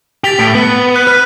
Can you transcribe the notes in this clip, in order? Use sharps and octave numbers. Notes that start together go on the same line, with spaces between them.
G4 A6 B6 F7
A2
B3
F#6 D#7
B4 F6